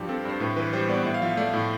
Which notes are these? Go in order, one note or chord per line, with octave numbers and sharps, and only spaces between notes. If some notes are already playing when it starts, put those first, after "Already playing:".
Already playing: G2 F3 G4
C4 A4
G2 C5
A2 B4
E3 B4
G3 C5
B3 D5
A2 E5
F5
F3 E5
A3 D5
A2